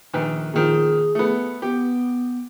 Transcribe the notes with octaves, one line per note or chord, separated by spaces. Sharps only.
A#1 D#3 B4
A#2 D#3 F3 G#4
A3 B3
B3 G4